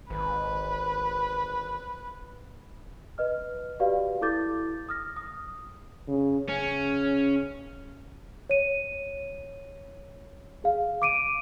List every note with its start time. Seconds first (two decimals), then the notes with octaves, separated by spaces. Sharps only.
0.10 G#1 B4
3.18 B4 D#5 F6
3.80 F#4 G4 B4 D5 F5
4.21 E4 A4 D6 G6 A6
4.89 D#6 F6 A#6
5.17 D#6
6.08 C#3
6.49 C#3 C#4
8.50 C#5 D#7
10.64 G#4 F5
11.02 D6 D7 D#7